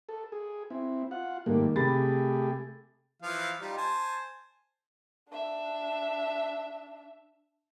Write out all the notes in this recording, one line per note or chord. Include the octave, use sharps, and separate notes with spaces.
A4
G#4
C4 E4
F4 F#5
G#2 D#3 G3 A3 A#3
C3 A3 G4 G#4 B5 A6
E3 F3 F5
G3 D#4 F4
C5 G#5 A5
D4 E5